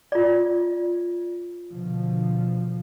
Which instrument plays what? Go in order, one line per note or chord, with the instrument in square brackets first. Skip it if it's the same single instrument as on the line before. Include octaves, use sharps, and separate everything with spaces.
[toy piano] F4 D5
[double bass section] B2 D3 F3